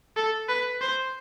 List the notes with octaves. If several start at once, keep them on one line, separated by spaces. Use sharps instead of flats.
A4
B4
C5